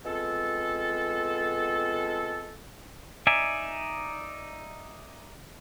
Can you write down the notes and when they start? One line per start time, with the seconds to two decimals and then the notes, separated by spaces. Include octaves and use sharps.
0.05 G#3 B3 C4 F4 A4
3.27 D#4 D5 E5 G#5